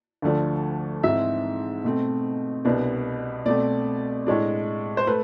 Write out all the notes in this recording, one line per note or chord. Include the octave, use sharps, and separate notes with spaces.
D2 D3 F3 A3 D4
G#2 E3 G#3 C4 E5
B2 A3 C4
C2 B2 B3 D4
B2 A3 C4 D5
A2 G#3 D4
C5
A3 B4